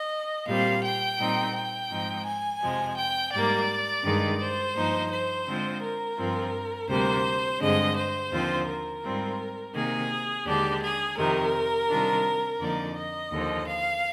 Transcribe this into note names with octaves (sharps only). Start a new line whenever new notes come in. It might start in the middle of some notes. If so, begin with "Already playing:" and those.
Already playing: D#5
A#2 G3 C4 F5
G5
A#2 G3 C4 D#4
G5
G#2 F3 G#3 C4 D#4
G#5
F2 C3 F3 G#3
G5
G#2 G3 A#3 D5
G2 D#3 G#3 D#4
C5
G2 F3 A#3 D#4
C5
D3 G#3 C4 F4
A#4
G2 F3 C4 F4
D2 C3 G3 A#3 C5
G2 D3 G#3 C4 D#5
C5
D#2 D3 F3 C4 F4
A#4
G#2 G3 C4 F4
C3 D#3 A#3 G#4
D#2 D3 G#3 D4 G4
G#4
F2 C3 D#3 A#4
C3 D#3 G3 D4 F4
F2 D3 F3 A#3 D#4 D5
D#5
D#2 D3 F3
F5